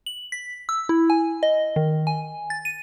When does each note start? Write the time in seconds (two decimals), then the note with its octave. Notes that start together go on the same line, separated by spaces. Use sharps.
0.06 F#7
0.32 B6
0.69 E6
0.89 E4
1.10 G#5
1.43 D#5
1.76 D#3
2.07 G#5
2.50 A6
2.65 D#7